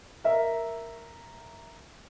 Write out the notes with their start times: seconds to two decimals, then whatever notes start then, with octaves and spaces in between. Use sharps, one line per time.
0.24 A#4 E5